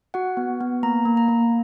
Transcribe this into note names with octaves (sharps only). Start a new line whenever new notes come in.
F#4 F#5
B3
B3
A#3 A#5
A#3
A#5
A#3